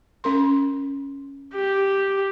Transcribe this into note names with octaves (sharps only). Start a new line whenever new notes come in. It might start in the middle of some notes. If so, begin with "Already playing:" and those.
C#4 A#4 C6
G4